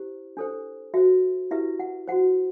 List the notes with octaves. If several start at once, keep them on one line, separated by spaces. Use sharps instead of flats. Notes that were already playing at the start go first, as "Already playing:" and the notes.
Already playing: E4 G4 C5
D4 A4 C5
F#4 C5 E5
E4 G4 B4 E5
F#5
F#4 C5 F#5